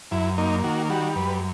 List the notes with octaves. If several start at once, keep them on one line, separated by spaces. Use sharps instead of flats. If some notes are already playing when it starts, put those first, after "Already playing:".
F#2 E4
A#3 D#4
D#3 F#4
G3 F#4
F#2 B4